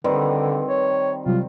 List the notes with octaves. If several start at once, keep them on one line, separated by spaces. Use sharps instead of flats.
D3 D#3 G3 C4 B4
C#5
C3 F#3 G3 F4